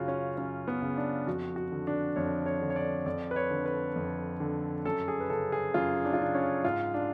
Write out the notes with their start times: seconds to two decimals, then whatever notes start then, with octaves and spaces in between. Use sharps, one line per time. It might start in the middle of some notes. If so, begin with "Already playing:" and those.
Already playing: F#2 C#3 F4 F#4
0.08 C#4
0.37 F#2 C#4
0.68 B3
0.82 C#3
0.97 D4
1.27 F2 F#4
1.56 F#4
1.72 D3
1.87 D4
2.16 F2 C#5
2.46 C#5
2.61 D3
2.70 C#5
2.76 D5
3.06 F2 D5
3.31 B4
3.36 C#5
3.51 D3
3.66 B4
3.96 F2
4.40 D3
4.85 F#2 A4
5.08 G#4
5.20 B4
5.30 C#3 A4
5.52 G#4
5.74 F#2 F4
6.05 D4
6.13 F4
6.20 C#3 D4
6.35 C#4
6.64 G#2 F4
6.94 D4